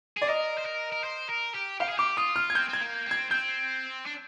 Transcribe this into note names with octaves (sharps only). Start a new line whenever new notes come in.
G#4 D5
A#4 D#5
C5
A#4
A#4
C5
A#4
G4
G4 F5
G#4
G4 D6
F4 D#6
F6
G#6
C4 G6
C4 G#6
A#3
C4
G#6
C4 G6
D4